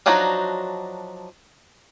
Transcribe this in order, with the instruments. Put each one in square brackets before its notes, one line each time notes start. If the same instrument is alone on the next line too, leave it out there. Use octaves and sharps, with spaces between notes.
[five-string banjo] F3 F#3 D4 D#4 F#4